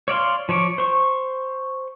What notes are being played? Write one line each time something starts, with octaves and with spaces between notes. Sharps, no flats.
C#5 D5 F5 C6
F3 C#5 C#6 D6
C5 C#6